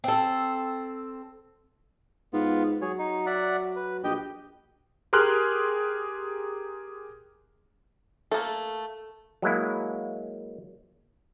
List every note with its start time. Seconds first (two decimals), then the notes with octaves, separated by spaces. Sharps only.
0.04 C4 A4
2.33 G#2 B3 F4
2.82 F#3 G#4 C#5
2.99 D#4
3.26 D5 E5 F#5
3.76 B4
4.04 A#1 G4 D#5 G5
5.13 G4 G#4 A#4 C6 F6 F#6
8.31 A3 A#3 A4
9.42 F#3 G#3 A#3 E4